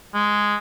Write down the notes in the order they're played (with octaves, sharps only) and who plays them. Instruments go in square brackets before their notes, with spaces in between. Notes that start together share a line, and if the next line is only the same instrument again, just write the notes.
[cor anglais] G#3